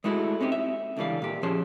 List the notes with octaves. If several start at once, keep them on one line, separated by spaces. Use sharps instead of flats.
G#3 A3 E4 F#4 G#4 A4
C4 C#4 D#4 G4
E5
C#2 D3 E3 G3 F5
A#2 G4
F3 C#4 G#4 A5 C6